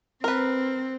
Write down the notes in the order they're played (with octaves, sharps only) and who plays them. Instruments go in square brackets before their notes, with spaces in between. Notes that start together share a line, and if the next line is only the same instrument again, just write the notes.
[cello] C4 [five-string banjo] A#4 B4